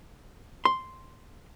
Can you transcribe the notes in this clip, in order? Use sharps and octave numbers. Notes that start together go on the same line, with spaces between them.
C6